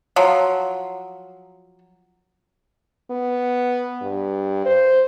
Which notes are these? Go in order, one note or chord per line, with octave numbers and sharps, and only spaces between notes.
F3 F#3
B3
G2
C5